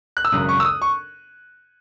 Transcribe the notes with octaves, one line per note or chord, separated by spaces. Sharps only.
F#6
E6
G#1 F#2 C#3 F#3 D#6
C#6
E6
D#6
C#6